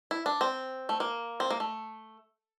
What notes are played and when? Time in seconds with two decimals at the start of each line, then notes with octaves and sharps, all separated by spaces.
0.11 E4
0.26 D4
0.41 C4
0.89 A3
1.00 A#3
1.40 C4
1.50 A#3
1.60 A3